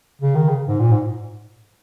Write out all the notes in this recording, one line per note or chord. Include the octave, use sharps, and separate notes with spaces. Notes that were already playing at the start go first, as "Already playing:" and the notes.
C#3
D#3
C#3
G#2
A#2
G#2